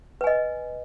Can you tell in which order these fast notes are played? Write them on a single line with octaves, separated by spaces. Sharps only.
B4 G#5 D#5